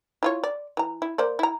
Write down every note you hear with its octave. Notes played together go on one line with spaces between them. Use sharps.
E4 F4 C#5
D5
E3 A#5
E4
A#3 C5 D5
E4 A#5